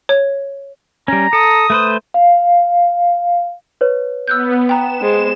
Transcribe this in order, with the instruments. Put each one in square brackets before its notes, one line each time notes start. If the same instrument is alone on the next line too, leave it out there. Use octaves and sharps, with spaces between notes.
[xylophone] C#5
[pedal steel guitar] G3 C#4 [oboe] A#5
[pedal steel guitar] A4 [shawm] D#6
[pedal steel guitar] A3 B4 C5
[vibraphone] F5
[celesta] B4 C#5
[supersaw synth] B3 [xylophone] E6 F#6 G6
[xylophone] G5 A#5 [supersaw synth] E7
[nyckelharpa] G#3 C5